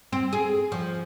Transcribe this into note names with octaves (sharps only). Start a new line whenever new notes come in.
C4
G#4
F3